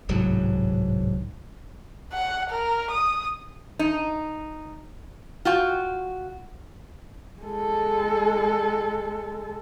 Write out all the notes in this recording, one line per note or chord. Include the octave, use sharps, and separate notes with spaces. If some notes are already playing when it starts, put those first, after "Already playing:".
D1 C2 G#2 F#3
F#5
A#4
D#6
D#4
F4 F#4 G5
G#3 A4